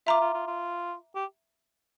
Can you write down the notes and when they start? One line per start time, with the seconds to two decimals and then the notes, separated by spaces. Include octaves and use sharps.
0.07 F4 E5 A#5 D6
0.20 F4
0.34 F4
0.47 F4
1.15 G4